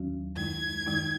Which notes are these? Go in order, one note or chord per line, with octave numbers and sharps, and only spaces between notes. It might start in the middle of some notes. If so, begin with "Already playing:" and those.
Already playing: D#2 D#3 F#3 C#4 F#4
F#2 D#3 G#3 D#4 G#6
F#2 D#3 G#3 D#4